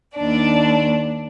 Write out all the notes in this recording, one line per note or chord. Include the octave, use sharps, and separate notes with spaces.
D#2 D4 D5